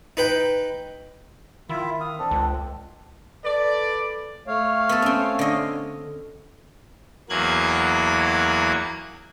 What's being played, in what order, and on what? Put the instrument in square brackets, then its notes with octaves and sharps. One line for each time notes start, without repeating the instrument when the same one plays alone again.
[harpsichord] D#4 B4 G5
[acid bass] D#3 [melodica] E4 F4 E5
[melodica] F5 D#6
C4 D4 A4
[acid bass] C#2
[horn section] A4 B4 D5
[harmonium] A3 C#5 F5
[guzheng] B3 A4
C4 C#4
D3 D#5
[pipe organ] E2 F#3 A#3 F#6 G#6